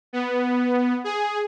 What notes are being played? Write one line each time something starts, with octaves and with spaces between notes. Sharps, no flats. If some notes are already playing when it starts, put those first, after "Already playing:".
B3
G#4